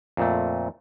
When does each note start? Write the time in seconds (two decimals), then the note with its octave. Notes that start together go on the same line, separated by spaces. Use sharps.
0.17 F2 A#2 A3